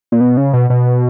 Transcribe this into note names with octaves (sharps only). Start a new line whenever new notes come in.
A#2
B2
C#3
B2
B2